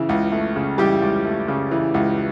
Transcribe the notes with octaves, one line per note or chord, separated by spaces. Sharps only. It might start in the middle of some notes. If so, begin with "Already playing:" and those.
Already playing: C#3 E3
C#2
A3
C#3
E3 G3 G4
C#2
A3
C#3
E3
C#2